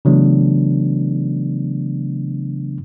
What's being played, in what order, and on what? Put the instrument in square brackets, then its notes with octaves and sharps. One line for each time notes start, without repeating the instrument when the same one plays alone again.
[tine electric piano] C#3 E3 F#3 A3 B3 D4